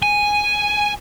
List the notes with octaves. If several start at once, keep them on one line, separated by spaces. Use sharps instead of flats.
G#5